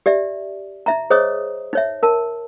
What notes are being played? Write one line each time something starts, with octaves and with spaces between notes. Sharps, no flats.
G4 D5 E5
D#4 E5 A#5
G#4 C5 C#5 D#5 D#6
D#4 C#5 E5
A#4 A5